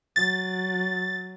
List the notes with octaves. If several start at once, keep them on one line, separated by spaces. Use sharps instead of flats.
F#3 A6